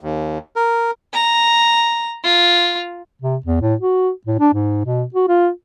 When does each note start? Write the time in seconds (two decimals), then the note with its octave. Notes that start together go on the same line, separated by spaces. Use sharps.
0.01 D#2
0.56 A#4
1.13 A#5
2.24 F4
3.22 C3
3.46 E2
3.61 A2
3.81 F#4
4.27 A2
4.39 D4
4.53 G#2
4.85 B2
5.14 F#4
5.28 F4